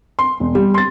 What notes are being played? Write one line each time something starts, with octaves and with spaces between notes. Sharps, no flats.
C6
E1
G3
C6 A6